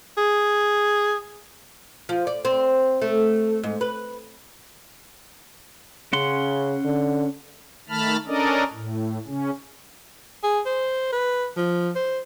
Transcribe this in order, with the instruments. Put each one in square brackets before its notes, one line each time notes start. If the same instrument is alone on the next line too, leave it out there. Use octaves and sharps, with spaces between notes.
[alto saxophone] G#4
[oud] F3
D5
C4
A3
G#2
B4
[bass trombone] C#3 [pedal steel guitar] C#4 F#5 C6
[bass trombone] D3
[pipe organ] D#3 A3 A5 B5 F6
C#4 D4 A4 A#4 D5 D#5
A2
C#3 C#4
[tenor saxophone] G#4
C5
B4
F3
C5